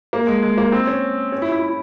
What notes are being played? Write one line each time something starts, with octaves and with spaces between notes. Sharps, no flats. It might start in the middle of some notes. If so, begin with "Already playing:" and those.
A#3
G#3
G#3
A#3
C4
C#4
C#4
E4
E4
E4